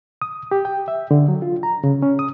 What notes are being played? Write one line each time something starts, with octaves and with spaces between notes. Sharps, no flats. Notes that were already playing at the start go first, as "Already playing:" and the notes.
D#6
G4
G5
E5
D3
F#3
F4
A#5
C#3
C#4
D#6